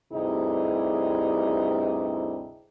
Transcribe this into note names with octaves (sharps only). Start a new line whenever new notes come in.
D2 G2 C3 D#4 E4 G#4